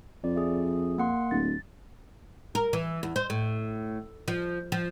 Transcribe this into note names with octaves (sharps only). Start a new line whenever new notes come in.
F2 D5
G#4 E5
A#3 F#5 C6
D1 A6
A#4
E3
E2
C5
A2
F3
F3